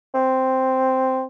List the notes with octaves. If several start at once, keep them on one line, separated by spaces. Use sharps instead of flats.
C4